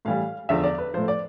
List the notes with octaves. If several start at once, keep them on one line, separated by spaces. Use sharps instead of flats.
A2 E3 G3 F5
E2 D3 F3 E5
D5
B4
A2 F3 C5
D5